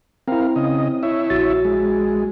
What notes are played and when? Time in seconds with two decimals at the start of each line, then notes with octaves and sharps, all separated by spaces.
0.28 C4 E4 A#4 F5
0.56 C#3 D#5
1.03 E4 C#5 E5
1.30 A#1 F#4 A6
1.65 G#3